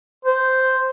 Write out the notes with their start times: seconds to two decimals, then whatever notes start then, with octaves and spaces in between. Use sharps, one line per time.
0.25 C5